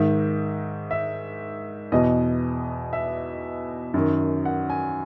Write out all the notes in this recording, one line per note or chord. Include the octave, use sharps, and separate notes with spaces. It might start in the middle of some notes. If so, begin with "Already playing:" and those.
Already playing: G#2 D#3 E5
E5
E2 B2 D#5
E5
F#2 D#3
F#5
G#5